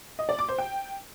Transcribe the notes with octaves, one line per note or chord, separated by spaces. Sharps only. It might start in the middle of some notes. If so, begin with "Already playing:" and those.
D#5
D5
D6
C5
G5